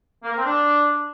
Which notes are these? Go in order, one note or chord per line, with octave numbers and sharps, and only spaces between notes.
A#3
A#4
C4
D4